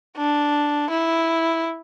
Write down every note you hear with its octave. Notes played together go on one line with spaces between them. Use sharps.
D4
E4